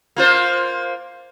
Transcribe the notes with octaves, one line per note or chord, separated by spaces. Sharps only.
A#3 F4 C5